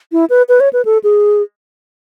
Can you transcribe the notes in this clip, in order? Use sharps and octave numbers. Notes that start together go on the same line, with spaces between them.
E4
B4
B4
C#5
B4
A4
G#4